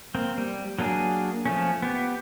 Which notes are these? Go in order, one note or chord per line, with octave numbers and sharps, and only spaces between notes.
A#3 C4
G3
F#3 A#3 D4 G#4
F3 A3 C#4
B3 G4